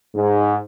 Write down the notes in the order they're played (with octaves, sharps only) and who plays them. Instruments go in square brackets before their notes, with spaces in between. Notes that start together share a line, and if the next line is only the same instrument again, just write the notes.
[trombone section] G#2